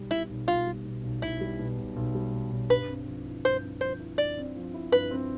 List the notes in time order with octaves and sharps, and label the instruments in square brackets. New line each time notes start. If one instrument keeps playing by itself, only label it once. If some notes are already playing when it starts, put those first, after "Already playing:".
Already playing: [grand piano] B1 G3
[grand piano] B2 [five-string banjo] E4
[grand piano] B1
[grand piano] B1 [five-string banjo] F4
[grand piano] G3
B2
B1
[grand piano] B1 [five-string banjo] E4
[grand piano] G3
B2
B1
B1
G3
B2
B1
[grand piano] G2 [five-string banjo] B4
[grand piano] C4
F3
E4
[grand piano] G2 [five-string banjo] C5
[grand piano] C4
[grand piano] F3 [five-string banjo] C5
[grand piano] E4
[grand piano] G2 [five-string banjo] D5
[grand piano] C4
F3
E4
[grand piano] G2 [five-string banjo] B4
[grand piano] C4